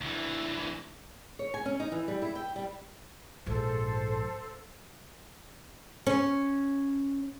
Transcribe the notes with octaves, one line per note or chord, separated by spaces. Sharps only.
D2 E3
C#5
G#5
C#4
D#4
E3
G3
E4
G5
G3
A#1 G#2 A4 C5
C#4